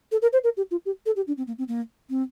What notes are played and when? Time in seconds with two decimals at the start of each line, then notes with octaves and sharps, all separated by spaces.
0.12 A4
0.22 A#4
0.33 C5
0.44 A#4
0.57 G4
0.71 F4
0.86 G4
1.06 A4
1.16 G4
1.27 D4
1.38 C4
1.47 A#3
1.58 C4
1.68 A#3
2.10 C4